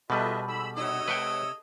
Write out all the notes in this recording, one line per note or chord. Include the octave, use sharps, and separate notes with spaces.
B2 G3 F4 G#4 A4 B4 D#5 E5
G#2 B5 E6
C3 D4 F#4 C#5 D#5 E6
G#3 B4 F#5 G5